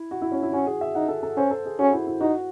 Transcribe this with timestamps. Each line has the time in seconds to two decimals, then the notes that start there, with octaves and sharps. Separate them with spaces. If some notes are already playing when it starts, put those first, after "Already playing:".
Already playing: E4
0.11 F#4
0.22 E4
0.32 C#4
0.43 E4
0.53 C#4 F#4
0.67 G#4
0.81 E5
0.95 D#4 F#5
1.08 A4
1.23 A4
1.37 C#4 C5
1.51 A4
1.66 G#4
1.79 C#4 F#4
1.93 E4
2.07 E4
2.21 D#4 F#4